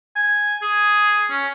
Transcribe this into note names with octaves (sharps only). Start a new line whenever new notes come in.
G#5
G#4
C#4